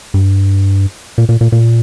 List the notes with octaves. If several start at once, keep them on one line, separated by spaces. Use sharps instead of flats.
G2
A#2
A#2
A#2
A#2